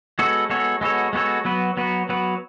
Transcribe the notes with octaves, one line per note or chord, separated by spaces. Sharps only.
G#3 B3 F#4 A4 C#5
G#3 B3 F#4 A4 C#5
G#3 B3 F#4 A4 C#5
G#3 B3 F#4 A4 C#5
F#3 B3 F#4 B4
F#3 B3 F#4 B4
F#3 B3 F#4 B4